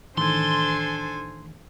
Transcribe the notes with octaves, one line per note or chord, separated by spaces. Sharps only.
A2 D#3 E3 D4 A4 C5 G#5 C6